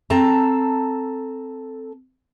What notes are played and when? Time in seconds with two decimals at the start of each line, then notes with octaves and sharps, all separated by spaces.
0.10 C4 A4 A5 A#5